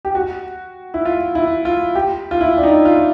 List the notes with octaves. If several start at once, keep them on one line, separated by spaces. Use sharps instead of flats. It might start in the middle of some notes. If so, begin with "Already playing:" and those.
G4
F#4
E4
F4
E4
F4
G4
F4
E4
D4
D#4
F4